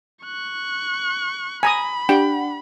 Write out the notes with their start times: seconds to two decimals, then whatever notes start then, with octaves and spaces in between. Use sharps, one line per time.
0.24 C#6 F#6
1.63 G#5 A#5 B5 D#6
2.09 D4 G4 F#5 G5